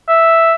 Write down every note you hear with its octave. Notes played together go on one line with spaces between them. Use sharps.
E5